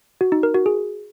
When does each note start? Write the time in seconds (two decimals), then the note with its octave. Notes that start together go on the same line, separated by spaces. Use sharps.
0.21 F#4
0.32 D#4
0.43 A#4
0.55 F#4
0.66 G#4